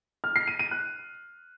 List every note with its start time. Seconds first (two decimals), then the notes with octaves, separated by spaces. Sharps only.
0.24 F6
0.36 C7
0.48 D#7
0.59 D#7
0.71 F#6